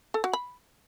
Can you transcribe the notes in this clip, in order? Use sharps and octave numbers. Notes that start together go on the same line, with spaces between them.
A4
F#4
B5